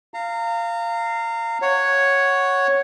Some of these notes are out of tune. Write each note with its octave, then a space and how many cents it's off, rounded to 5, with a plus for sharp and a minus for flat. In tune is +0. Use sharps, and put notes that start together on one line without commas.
F5 -10 A#5 -30
C#5 +0 F#5 +0